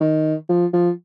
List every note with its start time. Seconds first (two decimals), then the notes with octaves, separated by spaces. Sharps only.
0.01 D#3
0.49 F3
0.73 F3